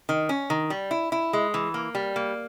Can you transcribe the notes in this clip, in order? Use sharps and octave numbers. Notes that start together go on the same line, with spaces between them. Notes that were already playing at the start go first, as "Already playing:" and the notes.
D#3
C#4
D#3
G3
E4
E4
G#3
E3
A#3
G3
A#3